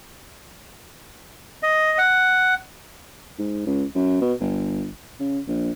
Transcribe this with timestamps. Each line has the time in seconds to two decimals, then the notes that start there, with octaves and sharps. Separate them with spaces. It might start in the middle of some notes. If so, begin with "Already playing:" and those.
1.63 D#5
1.98 F#5
3.39 G#2
3.67 C#2
3.95 F#2
4.21 B2
4.40 G1
5.20 C#3
5.48 A#1